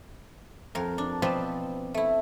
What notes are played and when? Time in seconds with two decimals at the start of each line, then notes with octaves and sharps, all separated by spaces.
0.75 F2 A#4
0.98 D4
1.22 B2 F3 C4 B4 D5 A5
1.94 A3 E4